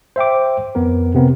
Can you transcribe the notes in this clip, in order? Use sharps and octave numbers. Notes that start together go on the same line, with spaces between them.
C5 E5 G5 D6
F2 B3 A#4
C3 B3 C4 A#4